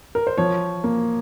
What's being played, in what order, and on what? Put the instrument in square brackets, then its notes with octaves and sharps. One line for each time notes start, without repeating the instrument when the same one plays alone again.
[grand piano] A#4
C5
F3 C#5
A#3